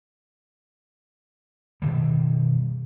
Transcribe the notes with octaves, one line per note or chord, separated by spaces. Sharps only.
B2 D#3 E3 G3